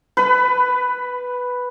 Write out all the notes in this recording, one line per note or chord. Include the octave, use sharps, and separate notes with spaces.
B4 B5